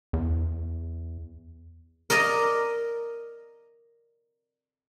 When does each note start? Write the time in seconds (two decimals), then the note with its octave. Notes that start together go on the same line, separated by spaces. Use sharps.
0.13 E2
2.10 A#4 D5 D#5 A#5